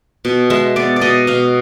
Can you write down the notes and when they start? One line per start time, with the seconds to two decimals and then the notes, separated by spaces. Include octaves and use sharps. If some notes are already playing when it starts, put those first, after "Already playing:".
0.25 B2
0.50 G#3 E5
0.76 B3 D5
0.96 D5
1.01 B2 D#5
1.27 B2 F5